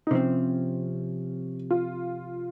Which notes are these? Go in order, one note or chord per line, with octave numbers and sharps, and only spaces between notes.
D#4
C3 F3 C4 C#4
F4